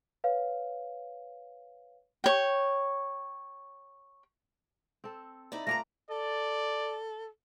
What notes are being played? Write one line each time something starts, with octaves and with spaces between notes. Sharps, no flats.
B4 C#5 F5
C#5 G5
C4 A4
D#4 E4 D5
G2 A3 F4 D5 G#5 A#5 A#6
A4 D5